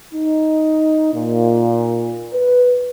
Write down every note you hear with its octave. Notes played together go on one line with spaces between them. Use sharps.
D#4
A#2
B4